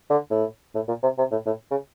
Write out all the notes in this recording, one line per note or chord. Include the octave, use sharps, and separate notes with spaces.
D3
A2
A2
A#2
C3
C3
A2
A2
C#3